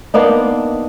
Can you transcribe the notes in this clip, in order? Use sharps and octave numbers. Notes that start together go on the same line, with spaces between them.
A#3 B3 D4 D#4